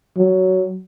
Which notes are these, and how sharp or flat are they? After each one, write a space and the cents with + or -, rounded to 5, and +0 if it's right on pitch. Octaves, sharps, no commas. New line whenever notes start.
F#3 +15